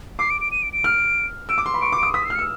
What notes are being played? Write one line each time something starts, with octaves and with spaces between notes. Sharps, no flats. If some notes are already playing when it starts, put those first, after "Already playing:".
D6 C7
D7
D7
D#7
D7
D7
F6
E6 D7
D6
C6
B5
C#6 D7
D6
D#6 D7
D#6 B6
E6
C7
F6
C#7
E6